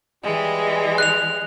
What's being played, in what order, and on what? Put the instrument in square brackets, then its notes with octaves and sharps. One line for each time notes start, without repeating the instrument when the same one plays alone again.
[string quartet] E3 G3 G#3
[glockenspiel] F#6 F7